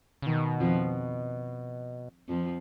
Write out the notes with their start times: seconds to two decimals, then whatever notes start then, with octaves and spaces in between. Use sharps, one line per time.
0.22 C#3
0.26 B2 D#3
0.60 F2 F3
2.29 F2 F3